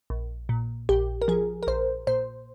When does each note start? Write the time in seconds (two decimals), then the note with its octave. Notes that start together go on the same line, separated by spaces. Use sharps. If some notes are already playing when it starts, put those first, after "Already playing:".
0.10 A#1
0.49 A#2
0.89 A#1 G4
1.22 A#4
1.28 F3 G#4
1.63 A#4
1.67 A#1 C5
2.07 A#2 C5